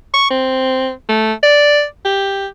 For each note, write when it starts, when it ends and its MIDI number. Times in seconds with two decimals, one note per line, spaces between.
0.14 0.28 85
0.31 0.91 60
1.09 1.33 57
1.43 1.84 74
2.05 2.47 67